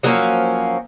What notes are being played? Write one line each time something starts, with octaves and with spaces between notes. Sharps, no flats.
F3 F#3 A#3 C#4